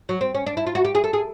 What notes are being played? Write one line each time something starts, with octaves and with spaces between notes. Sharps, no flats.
F#3
C4
C#4
D4
E4
F4
F#4
G4
G#4
A4
G#4